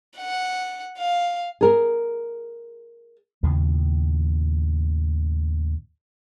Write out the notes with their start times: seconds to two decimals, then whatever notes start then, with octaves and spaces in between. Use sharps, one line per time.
0.17 F#5
0.98 F5
1.61 G#4 A#4
3.43 D#2 A2 C#3 F3